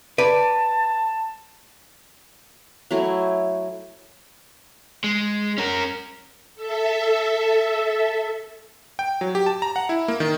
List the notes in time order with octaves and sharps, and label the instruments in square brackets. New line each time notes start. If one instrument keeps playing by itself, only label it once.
[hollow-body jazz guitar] B4 D5 [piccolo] A5
[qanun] F#3 A3 E4 C#5
[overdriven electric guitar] G#3
C#4 A#4
[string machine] A4 E5
[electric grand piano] G5
F#3
G4
A5
A#5
F#5
E4
A#3
D#3